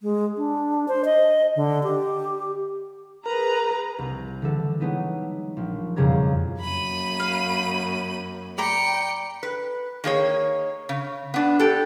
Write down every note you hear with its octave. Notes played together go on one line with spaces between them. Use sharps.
G#3
D4
C5
D#5
D3
G4
G#4 A#4 B4 A#5
C2
D3 E3 A4
F#3 G#3 B3 D#4 E4
A#1
E1 F2 C#3 G3 A#5 G#6
F#2 A#3 B5 D#7
F5
D5 G5 A#5 B5 C#7
B4
D#3 A#3 G#4 C#5
C#3
B3 D4
G4 A4